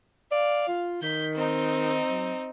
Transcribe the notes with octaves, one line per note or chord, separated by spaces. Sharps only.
D5 F5
F4
D#3 G6 B6
C4 D#4
F#3